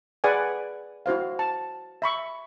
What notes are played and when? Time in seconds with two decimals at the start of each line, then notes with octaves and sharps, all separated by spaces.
0.24 G#4 B4 D5 F#5 G#5
1.06 E4 F#4 C5 F5
1.39 A5
2.02 E5 B5 C#6 E6